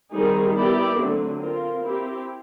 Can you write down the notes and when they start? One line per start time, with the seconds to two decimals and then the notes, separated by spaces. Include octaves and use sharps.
0.11 D#3 G3 C4 D#4 G#4
0.53 B3 E4 G4 A#4 D5
0.97 D3 F#3 A3 C4
1.39 C4 F4 A#4
1.82 C4 E4 G4